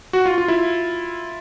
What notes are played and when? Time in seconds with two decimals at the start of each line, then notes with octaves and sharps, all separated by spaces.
0.13 F#4
0.26 F4
0.38 F4
0.48 E4